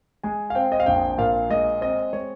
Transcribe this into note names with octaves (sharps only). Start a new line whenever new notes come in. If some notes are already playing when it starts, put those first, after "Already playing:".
G#3 G#5
F5
C4 G5
D#5
F5
A#1 G5
A#2 F5
G#3 D#5
C4 D#5
G#3 C#5